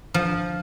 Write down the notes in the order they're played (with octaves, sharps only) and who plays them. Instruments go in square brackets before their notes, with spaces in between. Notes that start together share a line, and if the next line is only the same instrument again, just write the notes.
[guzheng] F3